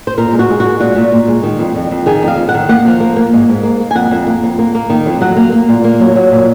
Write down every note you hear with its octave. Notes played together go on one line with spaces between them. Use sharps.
C5
A#2 A#4
G#3
F#4
G#3
F#4
G#3
A#2 F#4
A#2
A#2
G#3
D#3
F2
F2
F2
D#3 G#4
F2 F5
F2
F#5
D#3
A#3 F#5
F3
A#3
A#3
G#2
G#2
A#3
A#3
G#5
F2 F#5
F2
A#3
F2
A#3
A#3
D#3
F2
F#3 F#5
A#3
A#3
A#2
A#3
F#3
F#3
A#2